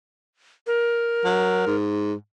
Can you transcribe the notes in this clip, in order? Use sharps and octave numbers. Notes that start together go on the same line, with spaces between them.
A#4
F#3
G#2